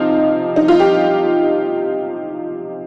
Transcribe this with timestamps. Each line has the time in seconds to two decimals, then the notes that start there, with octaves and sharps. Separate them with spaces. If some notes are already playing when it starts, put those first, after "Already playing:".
Already playing: C3 F3 D#4 F4
0.56 D#4
0.68 F4
0.79 G4